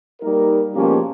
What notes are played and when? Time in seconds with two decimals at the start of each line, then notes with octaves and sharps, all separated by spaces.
0.21 G3 A#3 D#4 A#4
0.75 B2 F3 G#3 A#3 C#4 G4